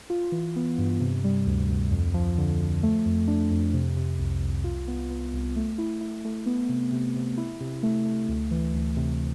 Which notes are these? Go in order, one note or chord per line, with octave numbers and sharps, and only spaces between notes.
F4
E3
B3
G2
C3
G3
D2
D2
F2
F3
D3
F3
A3
F2
D4
F2
C3
C3
C2
C2
F4
B3
B3
C2
A3
E4
E4
A3
B3
C3
C3
C3
E4
C3
A3
A3
D2
E3
D2
C3